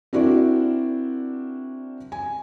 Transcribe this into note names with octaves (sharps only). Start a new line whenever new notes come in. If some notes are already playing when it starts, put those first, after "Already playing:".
C4 D4 E4 F#4 A#4 D5
G#5